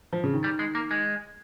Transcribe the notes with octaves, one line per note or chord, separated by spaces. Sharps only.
F3
C#3
D#3
G3
G#3
A#3
G#3